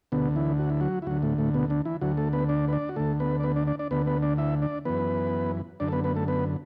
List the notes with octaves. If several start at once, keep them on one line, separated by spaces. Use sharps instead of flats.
D2 B2 D3 B3
E3 E4
F#4
E4
F#3 F#4
E4
D2 D3 F#3 F#4
A2 A3
A2 A3
B2 B3
D3 D4
E3 E4
D2 D3 F#3 F#4
A3 A4
B3 B4
D4 D5
B4
D4 D5
F#4
D2 D3 A3 A4
B3 B4
D5
B3 B4
D4 D5
D4 D5
D4 D5
D2 D3 B3 B4
B3 B4
D4 D5
E4 E5
D4 D5
F#2 E3 B3 B4
F#2 D3 D4 D5
A4
B3 B4
B3 B4
A3 A4
B3 B4